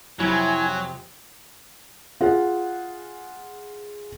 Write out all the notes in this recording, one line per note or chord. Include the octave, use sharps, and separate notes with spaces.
F2 C3 F#3 E4 G#5
F4 G#4 F#5